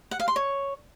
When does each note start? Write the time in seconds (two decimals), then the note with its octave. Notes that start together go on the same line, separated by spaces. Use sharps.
0.11 F#5
0.20 F5
0.28 C6
0.36 C#5